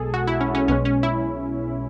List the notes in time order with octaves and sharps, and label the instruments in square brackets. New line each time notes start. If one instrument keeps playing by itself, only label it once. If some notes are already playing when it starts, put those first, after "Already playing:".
Already playing: [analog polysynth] B1 B2 G#3 G#4 A4
F#4
E4
C#4
C#4
B1 B2 G#3 C#4
C#4
E4